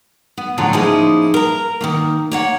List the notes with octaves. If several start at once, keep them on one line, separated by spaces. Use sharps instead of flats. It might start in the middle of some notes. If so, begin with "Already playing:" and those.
B3
A2 D3 F3 F#3
F3 A#3 C#4 D#4 E4 G#4
A#4 A#5
D#3 A3 A#3
A#3 C#5 F#5